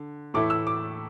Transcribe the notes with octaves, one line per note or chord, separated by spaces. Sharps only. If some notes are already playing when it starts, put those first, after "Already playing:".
Already playing: D3
A2 E3 A3 E4 D6
E6
D6